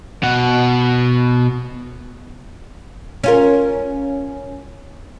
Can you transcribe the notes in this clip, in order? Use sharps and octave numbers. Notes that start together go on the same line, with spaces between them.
B2 F#5
C#4 F4 A#4